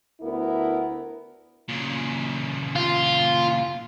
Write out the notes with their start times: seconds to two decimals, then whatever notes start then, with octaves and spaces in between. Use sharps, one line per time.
0.21 D2 B3 E4 A#4
1.69 A#2 C#3
2.76 F4